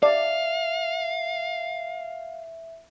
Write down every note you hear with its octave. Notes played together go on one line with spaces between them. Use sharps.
D5 E5 F5